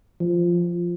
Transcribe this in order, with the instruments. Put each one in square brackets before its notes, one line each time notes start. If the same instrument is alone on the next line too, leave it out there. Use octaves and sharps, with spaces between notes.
[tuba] F3